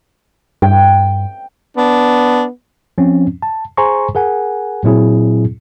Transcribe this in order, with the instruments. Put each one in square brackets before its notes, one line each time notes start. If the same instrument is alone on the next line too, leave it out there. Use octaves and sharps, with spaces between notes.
[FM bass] G2 [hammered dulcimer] G5
[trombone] B3 [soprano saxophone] D4
[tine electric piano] F3 C4 C#4
A5
G#4 C5 G#5 A#5 C6 C#6
G#4 A#4 F#5 G#5
A#2 F#3 C4 E4 G#4